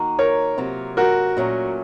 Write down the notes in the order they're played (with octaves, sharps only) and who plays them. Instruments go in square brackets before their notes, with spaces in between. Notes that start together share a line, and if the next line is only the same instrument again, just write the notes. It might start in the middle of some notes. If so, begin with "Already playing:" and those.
Already playing: [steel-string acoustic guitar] D#3 A#3 D#4 F#4
[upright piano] A#4 C#5
[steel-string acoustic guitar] C3 F#3 A#3 F4
[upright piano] F#4 A#4
[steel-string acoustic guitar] A#2 F#3 A3 C#4